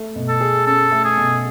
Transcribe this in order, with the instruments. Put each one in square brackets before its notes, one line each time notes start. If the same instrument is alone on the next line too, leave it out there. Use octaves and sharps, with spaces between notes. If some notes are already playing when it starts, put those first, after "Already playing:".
Already playing: [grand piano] A3
B2
[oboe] A4
[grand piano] G#4
[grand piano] C#4 [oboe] A4
[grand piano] A3
[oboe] G#4
[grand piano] B2